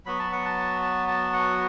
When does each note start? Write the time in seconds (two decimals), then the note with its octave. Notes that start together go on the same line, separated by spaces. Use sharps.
0.06 F#3 B3 F#4 B5
0.19 A5
0.32 F#5
0.45 A5
0.82 A5
1.08 A5
1.33 F#5